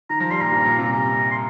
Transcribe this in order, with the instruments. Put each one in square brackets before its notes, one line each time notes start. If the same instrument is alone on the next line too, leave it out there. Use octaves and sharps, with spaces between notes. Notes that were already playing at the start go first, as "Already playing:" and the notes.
[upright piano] D#3 [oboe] A#5
[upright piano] F3 [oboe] A#5
[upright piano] G3 [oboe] C6
[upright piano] A#2 [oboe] A#5
[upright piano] G2
A#2
C3
[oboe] A#5
C6